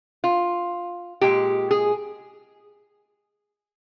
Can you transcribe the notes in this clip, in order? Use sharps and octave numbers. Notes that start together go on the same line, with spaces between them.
F4
A#2 G#3 G4
G#4